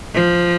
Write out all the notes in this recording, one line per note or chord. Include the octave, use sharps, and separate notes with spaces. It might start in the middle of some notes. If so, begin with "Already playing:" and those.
F3